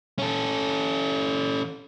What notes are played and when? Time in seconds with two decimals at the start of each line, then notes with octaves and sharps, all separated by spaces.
0.18 C#4 A4